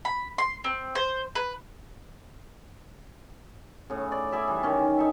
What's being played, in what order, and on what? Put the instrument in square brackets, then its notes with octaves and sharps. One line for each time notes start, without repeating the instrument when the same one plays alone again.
[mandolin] B5
C6
C4
C5
B4
[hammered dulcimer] A2 C#3
D5
E4 G#4 D5 E5
E3 G3
D#3 C#4
D#4 A4 E5